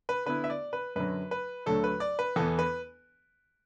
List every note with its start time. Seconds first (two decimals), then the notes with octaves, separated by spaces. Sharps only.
0.09 B4
0.26 D3 B3 E4 B4
0.44 E5
0.50 D5
0.73 B4
0.96 F#2 D3 F#3 B4
1.31 B4
1.66 D2 D3 F#3 A3 A4
1.84 B4
2.00 D5
2.19 B4
2.36 E2 E3 B3 A4
2.59 B4